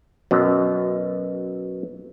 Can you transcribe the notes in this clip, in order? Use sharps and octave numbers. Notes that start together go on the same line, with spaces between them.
F#2 B2